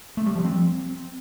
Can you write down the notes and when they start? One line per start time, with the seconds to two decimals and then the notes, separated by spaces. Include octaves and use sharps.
0.17 A3
0.26 G3
0.35 F3
0.45 C4